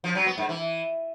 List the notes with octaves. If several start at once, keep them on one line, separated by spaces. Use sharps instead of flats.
F3
F#3
B3
G#2
E3